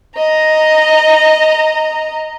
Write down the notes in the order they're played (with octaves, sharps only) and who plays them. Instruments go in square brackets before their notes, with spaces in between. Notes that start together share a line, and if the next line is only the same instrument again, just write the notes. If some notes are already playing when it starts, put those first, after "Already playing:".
[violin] D#5 A#5